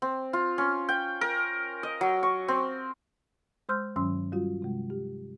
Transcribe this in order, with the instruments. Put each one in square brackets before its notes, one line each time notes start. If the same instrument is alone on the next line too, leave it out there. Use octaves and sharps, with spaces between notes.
[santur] C4
F4
C#4
G5
A#4
D#5
F#3
C#6
C4
[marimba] G#3 C5 C6 E6 F6 G6
G2 D#3 F#3 C#4 C6 E6
G3 F4 F#4
C3 G#3
G4